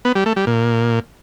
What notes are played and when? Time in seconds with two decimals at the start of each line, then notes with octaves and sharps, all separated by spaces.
0.05 B3
0.15 G3
0.26 A3
0.36 G3
0.47 A#2